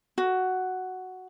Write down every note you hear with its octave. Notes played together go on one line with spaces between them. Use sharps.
F#4